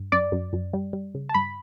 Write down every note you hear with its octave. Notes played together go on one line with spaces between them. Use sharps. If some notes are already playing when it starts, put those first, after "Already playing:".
Already playing: G2
F#2 D5
F#2
F#2
G3
G3
C#3
A5
G2 B5